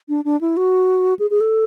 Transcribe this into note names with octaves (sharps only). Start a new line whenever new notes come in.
D4
D4
E4
F#4
G#4
G#4
A4